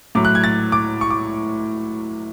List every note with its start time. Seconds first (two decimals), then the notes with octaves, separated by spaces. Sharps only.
0.15 A2 F#3 D6
0.25 F#6
0.35 G#6
0.44 A6
0.72 D6
1.01 C#6
1.10 D6